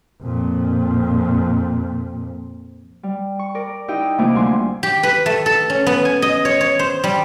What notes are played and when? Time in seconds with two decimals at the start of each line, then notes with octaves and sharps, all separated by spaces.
0.22 F2 A#2
3.03 G3
3.39 C#6
3.55 A#4 D5
3.88 D#4 E4 G4 D#5 G5
4.18 C3 E3 A3 A#3 F4 D6
4.35 D2 G3 G#5 C6
4.83 G4
5.03 B4
5.26 A3
5.46 A4
5.70 C#4
5.87 B3
6.05 G#5
6.22 D#5
6.45 C#5
6.61 C#5
6.79 C5
7.04 G3